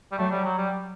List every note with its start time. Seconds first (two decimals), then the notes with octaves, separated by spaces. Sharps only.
0.12 G3
0.18 F#3 A3
0.31 G3
0.45 F#3
0.58 G3